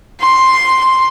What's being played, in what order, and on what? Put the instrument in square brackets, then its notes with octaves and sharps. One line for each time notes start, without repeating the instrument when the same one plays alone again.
[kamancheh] C6